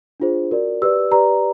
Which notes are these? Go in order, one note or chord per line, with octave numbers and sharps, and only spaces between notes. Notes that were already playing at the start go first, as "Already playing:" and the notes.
D4 F4 G#4 C5
F#4 A#4 D5
G4 B4 D5 E6
G4 B4 D5 A#5